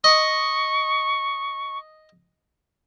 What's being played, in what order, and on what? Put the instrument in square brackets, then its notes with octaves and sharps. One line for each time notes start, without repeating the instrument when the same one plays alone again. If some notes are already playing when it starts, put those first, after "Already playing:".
[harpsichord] D#5 [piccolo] C#6